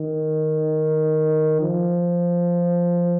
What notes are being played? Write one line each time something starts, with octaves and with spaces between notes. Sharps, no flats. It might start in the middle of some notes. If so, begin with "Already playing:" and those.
Already playing: D#3
F3